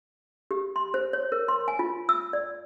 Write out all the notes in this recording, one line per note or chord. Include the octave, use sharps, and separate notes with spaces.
G4
C6
C5
C#5
A#4
C6
G#5
F4
E6
D5